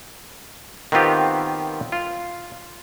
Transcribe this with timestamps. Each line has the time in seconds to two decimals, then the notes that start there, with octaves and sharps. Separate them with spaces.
0.92 D#3 B3 C4 F4 G4
1.92 F4